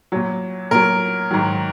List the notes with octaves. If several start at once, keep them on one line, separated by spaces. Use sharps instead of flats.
A#2 F#3
A#2 F#3 A#4
G#2 D#3 F#3